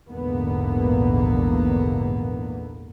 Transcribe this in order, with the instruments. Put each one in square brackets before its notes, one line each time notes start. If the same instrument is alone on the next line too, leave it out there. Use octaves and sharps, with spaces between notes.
[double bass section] A#1 E2 G#2 D3 A#3 B3